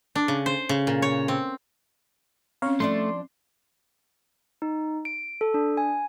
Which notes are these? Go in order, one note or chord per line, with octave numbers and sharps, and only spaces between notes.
D4
C#3
C5
C#3
A#2
C#5
C4
C4 C#4 C#5 F5
F3 A3 D4 D5 C6
D#4
D7
A4
D4
G#5